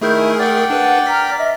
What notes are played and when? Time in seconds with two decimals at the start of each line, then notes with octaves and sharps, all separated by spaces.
0.01 D#3 A3 E4 G#4 A#4 G6
0.16 G#5
0.39 D5 F#5 G5
0.70 D4 B4
1.07 A#5 F6 B6
1.37 D#5 E5